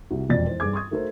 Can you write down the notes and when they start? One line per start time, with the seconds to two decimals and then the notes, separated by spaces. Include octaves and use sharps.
0.11 C2 F#4
0.29 E1 F2 C4 D5 A6
0.47 E3 C5
0.60 G2 G#4 D6 G#6
0.73 C6 C#6 D#6 G#6
0.91 A3 D#4 F#4 A4 A#4 C5